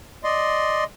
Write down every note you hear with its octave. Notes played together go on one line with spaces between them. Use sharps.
D5 D#5 C6